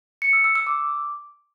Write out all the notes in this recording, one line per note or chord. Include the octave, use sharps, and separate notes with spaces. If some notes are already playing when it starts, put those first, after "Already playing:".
C#7
E6
E6
E6
D6